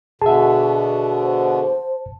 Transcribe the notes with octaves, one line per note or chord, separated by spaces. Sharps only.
B2 D3 G#4 E5 A5
C5